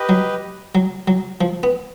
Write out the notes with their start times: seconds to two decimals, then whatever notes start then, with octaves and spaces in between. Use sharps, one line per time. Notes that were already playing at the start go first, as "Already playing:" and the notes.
Already playing: G4 B4 D#5
0.09 F#3
0.75 F#3
1.08 F#3
1.41 F3
1.63 B3